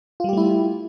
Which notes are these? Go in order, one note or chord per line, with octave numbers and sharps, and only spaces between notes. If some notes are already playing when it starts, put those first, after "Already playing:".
G3 A3 E4 F4 G4